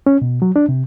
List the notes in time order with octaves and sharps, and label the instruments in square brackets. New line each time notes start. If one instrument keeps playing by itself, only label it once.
[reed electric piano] C#4
B2
F#3
D4
C3